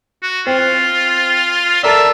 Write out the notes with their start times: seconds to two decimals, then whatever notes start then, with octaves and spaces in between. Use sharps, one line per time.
0.22 F#4
0.47 C4 F4
1.83 A4 A#4 D5 E5